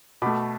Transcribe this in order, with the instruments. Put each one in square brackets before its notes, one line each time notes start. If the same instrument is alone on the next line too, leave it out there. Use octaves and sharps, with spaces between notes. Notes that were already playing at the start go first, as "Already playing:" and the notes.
[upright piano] B2 A3 B5 D6